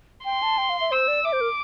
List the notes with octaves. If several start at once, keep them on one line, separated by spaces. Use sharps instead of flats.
G5 C6
A5
G5
F5
E5
C5 E6
D5
E5 D6
C5
A#4